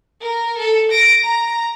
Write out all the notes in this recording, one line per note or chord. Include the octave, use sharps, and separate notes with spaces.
A#4
A4
A#6 D7
A#5